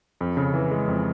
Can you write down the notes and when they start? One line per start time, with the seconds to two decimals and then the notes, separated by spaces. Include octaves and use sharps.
0.21 F2
0.37 C#3
0.54 E3
0.71 G#3
0.88 F2